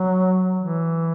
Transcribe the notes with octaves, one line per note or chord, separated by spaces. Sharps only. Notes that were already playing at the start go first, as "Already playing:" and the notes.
Already playing: F#3
E3